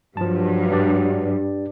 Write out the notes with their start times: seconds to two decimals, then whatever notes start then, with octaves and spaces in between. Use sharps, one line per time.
0.17 G2 F3 F#3 A5
0.72 D4 G4 D5